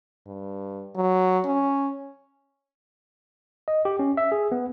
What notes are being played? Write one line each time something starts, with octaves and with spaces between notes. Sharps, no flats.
G2
F#3
C#4
D#5
G4
C#4
E5
G#4
B3